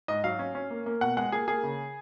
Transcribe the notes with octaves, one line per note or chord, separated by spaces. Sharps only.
G#2 D#5
F#3 F5
C#4
C#4
A#3
A#3
B2 F#5
G#3 F#5
A#3 G#4
A#3 G#4
C#3